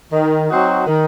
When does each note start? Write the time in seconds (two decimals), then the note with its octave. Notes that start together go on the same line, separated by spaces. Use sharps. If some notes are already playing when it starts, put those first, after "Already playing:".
0.13 D#3
0.50 F#3 C4 D#4 F#4
0.87 D#3